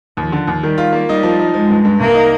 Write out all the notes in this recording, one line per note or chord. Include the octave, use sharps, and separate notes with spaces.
D#2 F3
D3
D#2
D#3 G3
F4
A#3
G3 D#4
F3
D#4
F3 G#3
G2
G2
C2 A#3
D#4